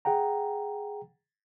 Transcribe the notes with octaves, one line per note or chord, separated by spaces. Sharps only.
G#4 F#5 G5 A#5